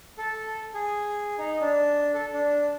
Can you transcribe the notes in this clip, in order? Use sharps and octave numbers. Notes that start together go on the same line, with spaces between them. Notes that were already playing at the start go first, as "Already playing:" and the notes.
A4
G#4
D#4
D4
A4
D4